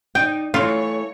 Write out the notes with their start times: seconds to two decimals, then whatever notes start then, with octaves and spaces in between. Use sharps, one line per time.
0.15 D#4 D5 G5
0.54 E3 A3 F4 C#5